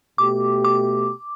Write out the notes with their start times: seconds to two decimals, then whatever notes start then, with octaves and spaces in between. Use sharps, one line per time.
0.18 B2 A3 G4 D6
0.64 D6